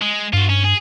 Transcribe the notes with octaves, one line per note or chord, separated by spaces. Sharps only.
G#3
G2 F4 F#4
C#4
G#4